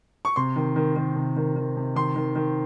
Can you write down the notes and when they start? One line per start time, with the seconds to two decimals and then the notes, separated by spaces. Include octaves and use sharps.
0.25 C#6
0.36 C3 C6
0.56 D#3
0.76 D#3
0.96 D#3
1.16 C3
1.36 D#3
1.56 D#3
1.77 C3
1.96 D#3 C6
2.16 D#3
2.35 D#3